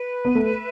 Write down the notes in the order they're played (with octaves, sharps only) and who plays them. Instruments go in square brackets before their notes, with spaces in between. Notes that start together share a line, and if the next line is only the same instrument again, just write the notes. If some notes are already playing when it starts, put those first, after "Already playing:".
Already playing: [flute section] B4
[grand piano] B3
[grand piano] A3 [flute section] E5